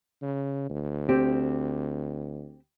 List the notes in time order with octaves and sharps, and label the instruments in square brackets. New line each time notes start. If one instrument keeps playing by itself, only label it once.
[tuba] C#3
D2
[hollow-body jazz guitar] C4 G4